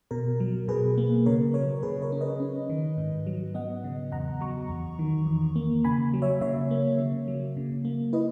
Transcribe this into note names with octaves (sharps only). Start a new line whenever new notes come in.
B2 A#4
F#3
B2 G#4 B4
A#3
C#3 A#4 C#5
F#3 A#4 C#5
C#3 G#4 B4
A#4 C#5
C#4
B4 D#5
C#4
D#3
G#2
F#3
B3 D#5 F#5
C#3
E2 F#5 A#5
F#3 A#5 C#6
E2
D#3
E2
A#3
C#3 G#5 B5
F#3
C#5 E5
C#3 C#5 E5
A#3
C#3
F#3
C#3
A#3
E4 B4 D#5